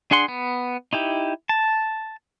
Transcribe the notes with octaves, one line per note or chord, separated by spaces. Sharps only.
D4 G#4 F#5 C6
B3
D#4 E4 G4
A5